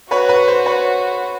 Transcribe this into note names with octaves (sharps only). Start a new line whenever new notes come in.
F#4 B4 C#5
B4
C5
B4 C#5